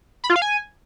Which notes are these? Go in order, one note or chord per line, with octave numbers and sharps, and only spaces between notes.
B5
F4
F5
G#5